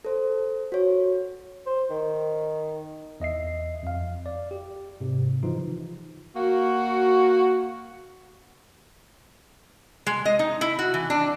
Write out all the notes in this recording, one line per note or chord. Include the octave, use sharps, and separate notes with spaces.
A4 C5
F#4 C#5
C5
D#3
E2 D#5 E5 C7
F2 F5
D5
G4
G#2 C3
C#3 E3 F3 D#4 F4
A#3 F#4
G#3
D#5
D#4
E4
F#4
E3
D4